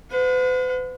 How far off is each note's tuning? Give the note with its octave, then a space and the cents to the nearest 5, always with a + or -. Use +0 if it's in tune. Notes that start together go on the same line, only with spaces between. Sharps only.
B4 +45 F#5 -40